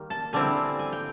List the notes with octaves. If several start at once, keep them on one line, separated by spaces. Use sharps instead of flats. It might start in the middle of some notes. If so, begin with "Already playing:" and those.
Already playing: D#3 G3 A#3
A5
D3 G3 C4 E4 G#5
G#5
G5